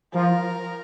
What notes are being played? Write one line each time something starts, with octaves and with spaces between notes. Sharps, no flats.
F3 F4 A#4